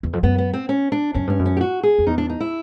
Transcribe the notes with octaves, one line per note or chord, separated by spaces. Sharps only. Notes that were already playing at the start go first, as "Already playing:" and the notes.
E2
F2
F#2 B3
B3
C4
C#4
D4
F#2 C#4
G2 C#4
F#2
C#4
G4
F#4
G#4
F2
E2 D#4
D4
D#4
E4